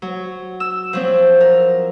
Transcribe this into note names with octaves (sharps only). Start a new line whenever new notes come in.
F#3
E6
F3 F#3 C4
A#4